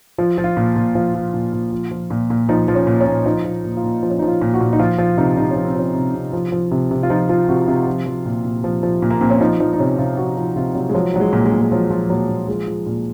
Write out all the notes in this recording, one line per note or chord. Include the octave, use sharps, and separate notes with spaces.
F3 F4
F3
F4
A#2
A#2
F3 F4
F3
A#2
A#2
F3
F3
A#2
A#2
F3 D#4
F3
C#4
A#2
C#4
A#2
F3 D#4
F3
A#2
F4
A#2
F3
C#4
F3 D#4
F4
A#2
F#4
A#2
D#4
F3 F4
F3 F4
C3 D#4
C3 D#4
C#4
F3
C4
F3 C#4
C3
C3
F3
F3
C3
C3
F4
F3 D#4
F3 F4
C3 F#4
C3 F4
F3
F3
A#2
A#2
F3
F3
A#2
A#3
A#2 C4
C#4
F3 D#4
F3 D#4
D#4
C3 C#4
C3 F4
F3 F#4
F3 F#4
C3 F4
C3 F#3
G#3
F3 F#3
F3 F#3
G#3
A#2
G#3
A#2
G#3
F3 F#3
F3
A#2 F#3
A#2
F3 G#3
F3
A#2